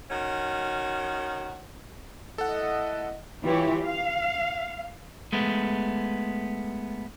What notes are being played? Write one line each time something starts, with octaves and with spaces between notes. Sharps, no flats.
D#3 C#4 F#4
A3 E4 A4 D#5 F#5
E3 E4 F4 G4 C#5
F5
G#3 A3 B3